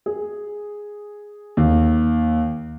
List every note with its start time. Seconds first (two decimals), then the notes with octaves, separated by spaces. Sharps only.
0.06 G#4
1.57 D#2